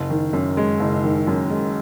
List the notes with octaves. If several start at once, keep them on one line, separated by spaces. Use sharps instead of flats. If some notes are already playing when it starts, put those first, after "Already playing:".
Already playing: F#1
D#3
F#2
G#3
F#1
D#3
F#2
G#3